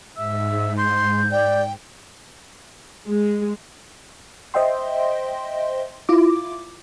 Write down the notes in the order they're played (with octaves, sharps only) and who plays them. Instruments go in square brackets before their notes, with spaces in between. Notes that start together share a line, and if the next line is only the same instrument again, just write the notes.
[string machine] G#2 [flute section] E5 E6
[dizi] C6 [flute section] G6
[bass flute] D5 [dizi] G5
[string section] G#3
[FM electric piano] C5 D#5 E5 G5 C6
E4 F4 D6